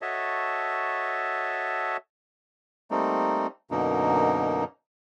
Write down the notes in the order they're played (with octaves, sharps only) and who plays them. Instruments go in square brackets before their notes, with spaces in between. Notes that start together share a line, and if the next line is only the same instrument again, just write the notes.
[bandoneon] F#4 A4 C#5 D#5 E5 A5
G3 A3 A#3 C4 D#4
F#2 B2 D3 A#3 D#4